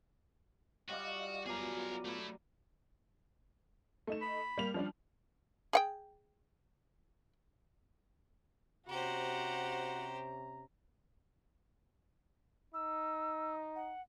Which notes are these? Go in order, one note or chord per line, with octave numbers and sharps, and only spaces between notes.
G3 F4 F#4 D5 D#5 F5
F#2 B3 F4 G#4 A#4 D5 A#5
A3 E4
A3 D#4 E7
B5
G3 A#3 F7
F3 G3 D4
G#4 F#5 G5
C3 C#4 F#4 G4 C5 F#5 A#5
D#4 E6
F#5